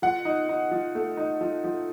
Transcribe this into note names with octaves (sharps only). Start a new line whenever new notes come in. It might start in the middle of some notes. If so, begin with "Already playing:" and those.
F3 F#5
D#4
D#4
F3
A3
D#4
F3
F3